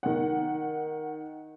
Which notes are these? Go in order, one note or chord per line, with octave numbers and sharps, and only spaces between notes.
D#3 F#5